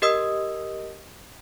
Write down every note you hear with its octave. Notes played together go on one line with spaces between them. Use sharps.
G4 A#4 D#5 D#6 E6